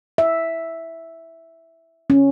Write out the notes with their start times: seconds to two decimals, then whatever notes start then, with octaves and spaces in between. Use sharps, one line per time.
0.18 E5
2.10 C#4